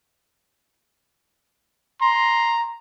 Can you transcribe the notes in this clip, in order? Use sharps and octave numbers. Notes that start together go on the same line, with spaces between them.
A#5 C6